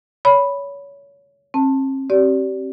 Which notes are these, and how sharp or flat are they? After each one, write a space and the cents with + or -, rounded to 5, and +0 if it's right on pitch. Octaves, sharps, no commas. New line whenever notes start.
C#5 +25 B5 +0
C4 +45 A5 +10
C4 +30 G4 -30 D5 -25